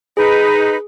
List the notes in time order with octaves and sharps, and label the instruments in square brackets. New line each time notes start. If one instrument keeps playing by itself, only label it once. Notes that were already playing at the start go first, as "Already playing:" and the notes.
[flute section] D#4 B4 [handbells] G#4